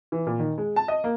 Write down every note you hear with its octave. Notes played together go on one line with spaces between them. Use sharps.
E3
A#2
D#3
G#3
A5
D#5
A#3